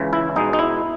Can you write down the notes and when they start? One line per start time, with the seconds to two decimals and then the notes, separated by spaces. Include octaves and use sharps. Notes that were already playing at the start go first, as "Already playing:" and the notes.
Already playing: C#2 C#3 E3
0.13 E4
0.36 B2 G#3 B3 D#4
0.53 D#4
0.59 E4